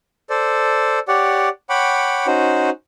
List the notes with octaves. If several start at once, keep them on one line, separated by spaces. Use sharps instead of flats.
A4 C5 D5
G4 C#5 D5 F#5
C#5 F#5 G5 B5 D6
C#4 D#4 F#4 C5